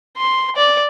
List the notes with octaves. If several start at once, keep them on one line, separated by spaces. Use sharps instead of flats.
C6
D5